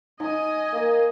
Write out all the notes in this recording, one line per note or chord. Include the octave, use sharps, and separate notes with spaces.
D#4 D#5 G#5
A#3